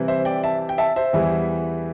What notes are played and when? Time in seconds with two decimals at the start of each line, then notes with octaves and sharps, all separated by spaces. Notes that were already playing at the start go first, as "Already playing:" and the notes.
Already playing: C3 E3 G3 C4 E4
0.08 C5 E5
0.25 D5 G5
0.43 E5 A5
0.69 G5
0.78 E5 A5
0.96 C5 E5
1.13 E2 E3 G3 E4